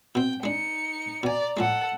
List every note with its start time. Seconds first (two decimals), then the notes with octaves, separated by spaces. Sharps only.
0.15 B2 C4 G5
0.43 G#3 D4 D#4 C#7
1.23 B2 D5 G#5 A#5
1.57 A2 F3 G#3 A4 F#5